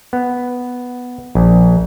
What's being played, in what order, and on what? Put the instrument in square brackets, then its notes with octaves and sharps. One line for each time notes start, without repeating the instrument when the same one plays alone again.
[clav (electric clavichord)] B3
A#1